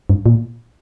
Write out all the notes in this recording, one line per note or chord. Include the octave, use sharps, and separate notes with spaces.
G2
A#2